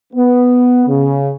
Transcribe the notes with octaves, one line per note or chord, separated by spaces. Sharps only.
B3
C#3